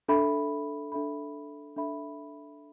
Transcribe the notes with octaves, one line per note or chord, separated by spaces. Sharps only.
D4 A4 E5 B5
D4 A4 E5 B5
D4 A4 E5 B5